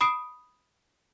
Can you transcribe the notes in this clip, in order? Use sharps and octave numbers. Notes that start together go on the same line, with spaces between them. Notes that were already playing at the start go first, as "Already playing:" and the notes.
B5 D#6 C7 D7